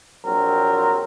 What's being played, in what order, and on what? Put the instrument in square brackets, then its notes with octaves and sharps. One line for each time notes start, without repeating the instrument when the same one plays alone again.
[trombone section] A#1 F#3 C4 A#4